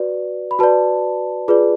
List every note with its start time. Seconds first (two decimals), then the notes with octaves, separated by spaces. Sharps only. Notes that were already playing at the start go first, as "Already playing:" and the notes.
Already playing: F#4 B4 D5
0.51 B5
0.59 F#4 B4 D5 A5
1.48 F4 G#4 B4 D5